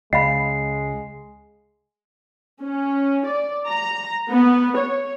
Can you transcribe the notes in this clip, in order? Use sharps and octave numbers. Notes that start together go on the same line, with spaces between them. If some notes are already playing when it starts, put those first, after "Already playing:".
C#2 G#3 D#5 F5 B5 C7
C#4
D5
A#5
B3
C#5